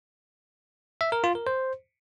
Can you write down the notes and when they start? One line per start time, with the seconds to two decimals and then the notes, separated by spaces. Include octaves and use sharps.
1.01 E5
1.12 A#4
1.24 F4
1.35 A#4
1.47 C5